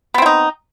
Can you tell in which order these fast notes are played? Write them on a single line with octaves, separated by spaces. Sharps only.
B3 C4 E4 D#4